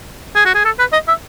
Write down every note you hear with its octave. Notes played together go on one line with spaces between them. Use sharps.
G#4
F#4
G#4
A4
B4
D#5
E5